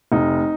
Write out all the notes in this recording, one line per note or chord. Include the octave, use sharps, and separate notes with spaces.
F1 D#4